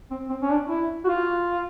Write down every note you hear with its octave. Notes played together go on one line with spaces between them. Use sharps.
C4
C4
C#4
D4
E4
F#4
F4